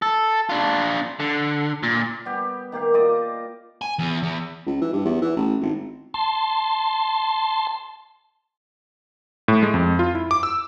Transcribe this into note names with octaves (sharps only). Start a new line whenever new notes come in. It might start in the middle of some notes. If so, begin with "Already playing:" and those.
A4
D4 F4
D3
A#2
G3 B3 G4
D#3 A#3 G4 F5
F4 D5 D#5 D6
G#5
E2
E2
C#2
E3
G2
E2
E3
A1
G#1
A5 C6
A2
G#3
F2
F4
E4
D6
E6